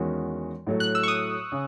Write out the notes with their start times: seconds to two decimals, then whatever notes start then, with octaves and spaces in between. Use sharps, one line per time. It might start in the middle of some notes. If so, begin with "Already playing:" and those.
Already playing: E2 D#3 G#3 C#4 F#4
0.67 A2 F#3 A3
0.80 F#6
0.95 E6
1.03 C#6
1.08 D#6
1.52 C#3